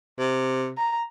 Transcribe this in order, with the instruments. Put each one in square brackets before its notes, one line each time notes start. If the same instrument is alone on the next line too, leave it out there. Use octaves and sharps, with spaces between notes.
[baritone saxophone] C3
[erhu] A#5